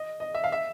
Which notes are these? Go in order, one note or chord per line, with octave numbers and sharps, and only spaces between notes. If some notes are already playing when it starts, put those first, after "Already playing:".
Already playing: D#5
D#5
E5
F5
E5